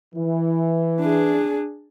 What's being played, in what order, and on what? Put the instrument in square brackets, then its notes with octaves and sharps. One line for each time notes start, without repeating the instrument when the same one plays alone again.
[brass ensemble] E3
[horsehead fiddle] D4 G#4